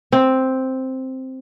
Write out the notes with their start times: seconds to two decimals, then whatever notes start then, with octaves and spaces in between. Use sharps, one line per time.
0.12 C4